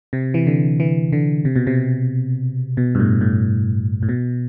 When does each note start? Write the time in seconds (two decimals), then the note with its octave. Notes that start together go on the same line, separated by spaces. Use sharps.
0.13 C3
0.34 E3
0.47 D3
0.80 E3
1.13 D3
1.45 C3
1.56 B2
1.67 C3
2.77 B2
2.95 G2
3.00 A2
3.21 A2
4.03 A2
4.09 B2